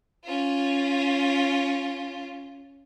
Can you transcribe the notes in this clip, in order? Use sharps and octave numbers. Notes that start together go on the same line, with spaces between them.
C#4 F4